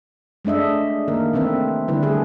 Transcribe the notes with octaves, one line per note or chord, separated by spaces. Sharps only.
G#3 A3 D4 D#5 E5
D#3 A#3 A#4
C3 E3 A3 C4 B4 E5
D3 G3 D4 E4 B4
G3 A3 D4 G#4